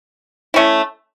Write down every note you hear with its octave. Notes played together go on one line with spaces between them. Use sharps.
A3 C#4 E4